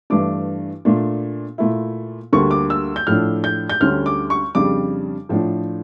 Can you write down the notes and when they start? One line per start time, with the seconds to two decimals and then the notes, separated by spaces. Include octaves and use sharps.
0.10 G2 E3 A3 D4 D6
0.85 A#2 A3 D4
1.58 A#2 A3 E4
2.33 D2 D3 G3 A#3 C#6
2.51 D6
2.70 E6
2.96 G6
3.07 A2 F3 A3 D4 F6
3.44 G6
3.70 G6
3.80 D2 D3 G3 C#4 F6
4.06 D6
4.30 C#6
4.55 F2 C#3 G3 D4 D6
5.29 A2 F3 A3 D4